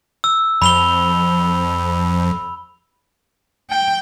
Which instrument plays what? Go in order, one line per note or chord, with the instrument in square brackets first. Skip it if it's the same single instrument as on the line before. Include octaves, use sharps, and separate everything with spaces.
[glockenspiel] E6
[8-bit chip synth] F2 [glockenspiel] B5 F7 G7
[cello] G5